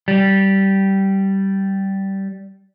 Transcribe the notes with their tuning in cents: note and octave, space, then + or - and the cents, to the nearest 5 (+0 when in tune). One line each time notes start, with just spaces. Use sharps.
G3 -15